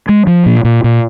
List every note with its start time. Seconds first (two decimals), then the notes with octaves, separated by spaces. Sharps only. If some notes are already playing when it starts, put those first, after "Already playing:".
0.09 G#3
0.27 F3
0.46 A#2
0.65 A#2
0.84 A#2